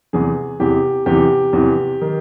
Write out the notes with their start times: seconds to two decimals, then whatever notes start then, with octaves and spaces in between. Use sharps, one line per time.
0.13 E2 C3 E3 G#4
0.60 E2 C3 E3 G4
1.06 E2 C3 E3 G4
1.53 E2 C3 E3
2.01 D#3